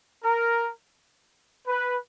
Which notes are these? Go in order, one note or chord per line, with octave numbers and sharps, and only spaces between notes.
A#4
B4